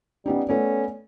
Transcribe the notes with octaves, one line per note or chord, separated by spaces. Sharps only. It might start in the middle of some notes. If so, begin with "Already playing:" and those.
G3 B3 C#4 D#4
A3 B3 C#4 D5